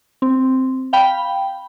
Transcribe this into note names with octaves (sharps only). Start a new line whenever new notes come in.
C4
F5 G5 B5